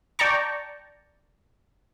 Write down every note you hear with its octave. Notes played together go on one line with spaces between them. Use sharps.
D5 G5 A5 A#5 C#6